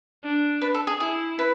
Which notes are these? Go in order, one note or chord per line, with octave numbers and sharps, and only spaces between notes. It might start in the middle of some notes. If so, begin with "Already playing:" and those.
D4
B4
A4
G#4
E4 G#4
B4